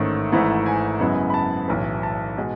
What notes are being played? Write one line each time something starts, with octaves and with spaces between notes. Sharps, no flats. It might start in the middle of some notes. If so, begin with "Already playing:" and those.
Already playing: A1 G#2 D#3 A3 C#4
G#1 G#2 E3 A3 E4
G#5
F#2 C#3 G#3 B3 E4
B5
A5
B1 A2 E3
A5
B2 G#3